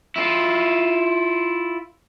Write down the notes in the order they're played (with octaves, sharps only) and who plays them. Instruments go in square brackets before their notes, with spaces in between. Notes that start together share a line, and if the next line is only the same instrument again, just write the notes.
[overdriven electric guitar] E4 F4